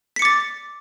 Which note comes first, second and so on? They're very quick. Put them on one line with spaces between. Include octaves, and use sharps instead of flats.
B6 C#7 D6 A6